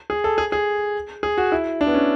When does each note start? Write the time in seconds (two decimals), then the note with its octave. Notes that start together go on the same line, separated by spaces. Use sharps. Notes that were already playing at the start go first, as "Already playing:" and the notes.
0.10 G#4
0.24 A4
0.38 G#4
0.52 G#4
1.23 G#4
1.38 F#4
1.52 E4
1.81 D4
1.87 B3
1.94 C#4